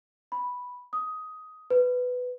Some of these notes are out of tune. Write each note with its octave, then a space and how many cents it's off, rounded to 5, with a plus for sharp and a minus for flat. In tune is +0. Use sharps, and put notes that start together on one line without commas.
B5 +0
D#6 +10
B4 +10